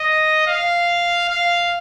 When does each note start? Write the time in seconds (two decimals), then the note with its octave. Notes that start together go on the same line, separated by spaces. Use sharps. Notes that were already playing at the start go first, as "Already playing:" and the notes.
Already playing: D#5
0.47 F5
1.29 F5